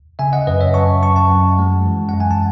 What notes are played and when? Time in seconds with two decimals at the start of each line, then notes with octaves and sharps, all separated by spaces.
0.19 C#3 E5 G#5
0.33 D#5 F#5
0.47 F#2 B4 D#5
0.61 C#5 E5
0.74 F#2 A5 C#6
1.02 F#2 A5 C#6
1.16 F#5 A5
1.30 F#2
1.59 G#3
1.86 E3
2.09 F#2 F#5
2.20 G#5
2.31 A5